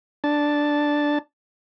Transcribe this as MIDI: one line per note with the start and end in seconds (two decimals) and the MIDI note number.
0.24 1.18 62
0.24 1.18 81